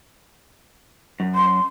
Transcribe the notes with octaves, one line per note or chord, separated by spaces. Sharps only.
F#2
C6